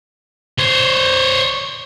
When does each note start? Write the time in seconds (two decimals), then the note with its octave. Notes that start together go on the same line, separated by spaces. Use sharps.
0.58 C5 C#5